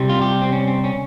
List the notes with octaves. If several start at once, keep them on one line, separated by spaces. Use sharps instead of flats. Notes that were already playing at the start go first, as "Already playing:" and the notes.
Already playing: C3 G3
F4
G4
C4
C#4
C4
C#4